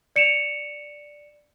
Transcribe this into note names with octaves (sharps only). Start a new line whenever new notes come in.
D5 C#7 D7 E7 F7